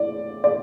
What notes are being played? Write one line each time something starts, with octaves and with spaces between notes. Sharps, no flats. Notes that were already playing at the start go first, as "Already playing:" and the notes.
Already playing: A2 D5
D5